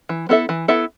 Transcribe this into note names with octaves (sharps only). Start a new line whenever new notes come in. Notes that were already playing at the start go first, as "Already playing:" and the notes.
E3
B3 E4 A4 E5
E3
B3 E4 A4 E5